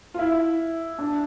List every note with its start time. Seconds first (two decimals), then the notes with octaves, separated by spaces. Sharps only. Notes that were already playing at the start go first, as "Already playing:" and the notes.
0.14 F4
0.19 E4
0.99 D4